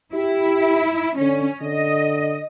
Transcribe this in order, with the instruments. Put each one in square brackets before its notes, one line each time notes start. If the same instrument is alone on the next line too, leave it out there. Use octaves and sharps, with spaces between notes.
[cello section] E4 [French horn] G4
[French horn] D3 [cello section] C#4
[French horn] D3 [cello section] D#5